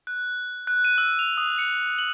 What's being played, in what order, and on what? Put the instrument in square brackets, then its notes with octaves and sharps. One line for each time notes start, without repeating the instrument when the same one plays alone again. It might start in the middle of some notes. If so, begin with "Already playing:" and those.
[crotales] F#6
F#6
D#7
E6
F7
D#6
C#7
F#7